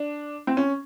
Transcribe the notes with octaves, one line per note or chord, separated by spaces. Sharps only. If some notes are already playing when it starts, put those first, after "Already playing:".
Already playing: D4
C4
C#4